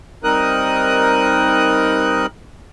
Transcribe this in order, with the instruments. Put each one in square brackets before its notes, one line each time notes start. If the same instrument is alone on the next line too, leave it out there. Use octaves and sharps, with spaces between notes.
[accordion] G3 C4 D#4 A#4 D#6 F#6